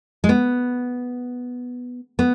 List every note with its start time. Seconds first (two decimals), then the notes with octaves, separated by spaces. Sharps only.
0.24 G#3
0.29 B3
2.19 B3